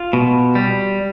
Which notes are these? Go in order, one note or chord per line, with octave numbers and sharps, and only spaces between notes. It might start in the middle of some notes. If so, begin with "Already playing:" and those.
Already playing: F4
B2
G3